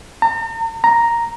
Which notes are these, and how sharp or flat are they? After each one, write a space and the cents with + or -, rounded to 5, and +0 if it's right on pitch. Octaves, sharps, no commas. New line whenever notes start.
A#5 -45
A#5 +0